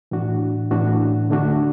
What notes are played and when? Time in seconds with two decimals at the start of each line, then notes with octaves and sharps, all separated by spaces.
0.11 A2 E3 D4 F#4
0.71 A2 E3 D4 F#4
1.30 D3 A3 D4 F#4